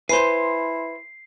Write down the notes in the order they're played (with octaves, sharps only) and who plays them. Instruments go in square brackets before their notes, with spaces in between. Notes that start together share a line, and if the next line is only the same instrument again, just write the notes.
[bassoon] E4 [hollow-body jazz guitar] B4 C5 [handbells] G#5 B5 C6 [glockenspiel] C7